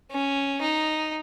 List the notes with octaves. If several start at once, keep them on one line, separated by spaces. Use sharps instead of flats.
C#4
D#4